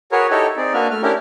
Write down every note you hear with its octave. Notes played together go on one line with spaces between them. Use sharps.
F#4 G#4 A#4 B4 C#5
D#4 E4 G4 A4 C#5 D#5
C4 D#4 G#4 D5
A#3 D4 F#4 B4 E5 F6
A3 F6
C#4 D4 E4 G4 A#4